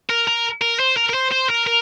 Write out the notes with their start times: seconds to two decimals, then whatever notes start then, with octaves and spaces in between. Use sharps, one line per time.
0.10 A#4
0.27 A#4
0.62 A#4
0.80 C5
0.97 A#4
1.09 A#4
1.14 C5
1.31 C5
1.49 A#4
1.67 A#4